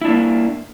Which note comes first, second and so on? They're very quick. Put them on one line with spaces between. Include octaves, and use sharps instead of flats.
E4 D4 A#3